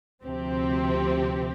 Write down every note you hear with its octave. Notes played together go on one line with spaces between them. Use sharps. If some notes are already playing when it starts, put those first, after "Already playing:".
D2 C3 F3 C4 G4